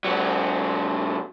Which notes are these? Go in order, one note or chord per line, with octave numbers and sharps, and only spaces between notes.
G#2 F#3